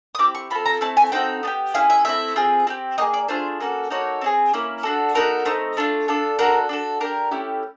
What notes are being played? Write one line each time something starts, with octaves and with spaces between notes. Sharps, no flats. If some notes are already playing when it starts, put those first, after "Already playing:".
D#6
C4 E4 G4 D6
C#6
C4 F4 A4 B5
A#5
A3 C4 E4 A5
G#5
C4 D#4 F#4 A4 G5
B3 D4 G4
C#4 E4 G#4 F5
E5
A3 C4 E4 E5
C4 F4 G#4
C4 E4 G4
A#3 D#4 G#4 D#5
D5
A3 D4 F4 G#4 C5
A#3 C#4 F#4 A4
A#3 D#4 F#4 A4 C#5
C4 E4 G#4
A#3 C#4 E4
D4 F#4 A4
B3 D#4 F#4 A4 A#4
A3 C4 D#4
A3 D4 F4
D4 F4 A4
D4 F#4 A4 A#4
D4 F#4 A4
D4 G4 A#4
A3 C#4 E4 G4